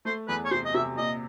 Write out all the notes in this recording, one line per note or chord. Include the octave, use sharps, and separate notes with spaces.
A3 C5
E2 B4
C#5
C3 C5
D#5
C3 E5
A#2 D#5